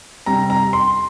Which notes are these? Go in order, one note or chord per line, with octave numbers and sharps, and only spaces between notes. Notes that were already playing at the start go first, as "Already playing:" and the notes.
C3 G3 A#5
A#5
C6